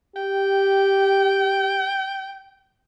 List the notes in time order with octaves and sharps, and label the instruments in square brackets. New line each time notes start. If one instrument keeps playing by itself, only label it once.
[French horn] G4 [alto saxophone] G5